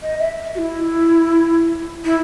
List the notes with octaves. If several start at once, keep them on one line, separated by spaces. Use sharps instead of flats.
D#5
E5
F#4
E4
E4